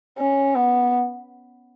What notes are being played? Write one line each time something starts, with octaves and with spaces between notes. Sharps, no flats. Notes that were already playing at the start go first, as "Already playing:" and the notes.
C#4
B3